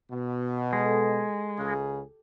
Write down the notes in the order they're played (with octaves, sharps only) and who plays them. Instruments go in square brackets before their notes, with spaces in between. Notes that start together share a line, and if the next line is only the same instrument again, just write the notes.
[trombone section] B2
[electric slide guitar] G#3 [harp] G4 A4
[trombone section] C#2 C#3 G#4